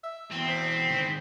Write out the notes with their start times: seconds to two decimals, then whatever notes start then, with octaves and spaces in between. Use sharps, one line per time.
0.04 E5
0.32 B2 E3 C4 G5
0.49 C5 B6
0.89 D#3 G#3